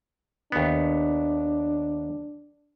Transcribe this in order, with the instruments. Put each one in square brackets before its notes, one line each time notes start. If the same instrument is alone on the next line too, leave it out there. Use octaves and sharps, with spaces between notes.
[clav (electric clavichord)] D#2 B3 [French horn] D4